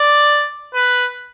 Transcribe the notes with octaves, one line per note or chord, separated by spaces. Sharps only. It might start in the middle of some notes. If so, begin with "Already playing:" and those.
Already playing: D5
B4